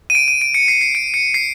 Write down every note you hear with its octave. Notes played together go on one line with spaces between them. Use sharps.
D#7
D7
D#7
D7
C#7
C7
C7
D7
C#7
C7